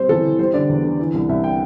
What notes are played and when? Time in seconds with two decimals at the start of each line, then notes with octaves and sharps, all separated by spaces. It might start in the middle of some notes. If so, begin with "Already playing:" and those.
Already playing: G3 C4 C5
0.09 E3 A4
0.24 E3
0.38 G3 C5
0.54 D3 D5
0.69 E2
0.84 D3
0.99 E3
1.14 C2
1.29 C2 E5
1.44 G5